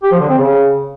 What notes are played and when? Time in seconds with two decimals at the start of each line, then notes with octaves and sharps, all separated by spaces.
0.03 G4
0.12 F3
0.20 D3
0.29 C4
0.37 C#3